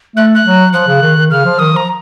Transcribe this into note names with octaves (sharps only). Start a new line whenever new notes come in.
A3 F#6
F#6
F#3
F3 F#6
C#3
D#3
D#3
C#3 F6
F3
D#3 D#6
F3 A#5